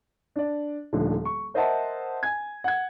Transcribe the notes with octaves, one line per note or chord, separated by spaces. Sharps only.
D4 D5
D#1 D3 D#3 F3 A3
C#6
A#4 C5 D#5 E5 F#5 A5
G#5 G#6
F#5 G#6